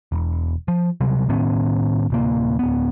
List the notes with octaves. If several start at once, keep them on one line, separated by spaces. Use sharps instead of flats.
E1
F3
C3 F#3 G3
A2 D#3 B3 C#4
D1 C3 A#3
D1 B3